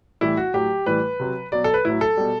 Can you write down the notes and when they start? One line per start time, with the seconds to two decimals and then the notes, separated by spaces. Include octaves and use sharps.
0.21 A2 E3 G3 E4
0.37 F#4
0.54 A2 F#3 G4
0.86 A2 E3 G3 B4
1.20 C3 F#3
1.52 B2 F#3 D5
1.64 A4
1.74 B4
1.85 A2 F#3 E4
2.01 A4
2.17 B2 G3